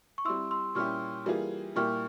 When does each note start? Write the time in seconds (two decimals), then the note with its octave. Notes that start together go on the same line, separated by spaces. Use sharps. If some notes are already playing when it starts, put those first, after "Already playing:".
0.18 C#6
0.25 G3 C4 E4 C6 E6
0.51 C6 E6
0.75 A#2 G3 C#4 E4 G4 C#6 F6
1.26 E3 G3 A#3 F4 G#4
1.76 A#2 G3 A#3 E4 G4 C#6 F6